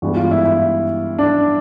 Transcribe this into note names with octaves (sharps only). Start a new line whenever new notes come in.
G2 E3 G#3 B3 F#4
F4
E4
E4
D4